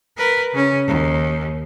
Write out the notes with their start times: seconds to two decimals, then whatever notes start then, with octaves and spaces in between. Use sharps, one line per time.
0.18 A#4 B4
0.53 C#3 C#4
0.87 D#2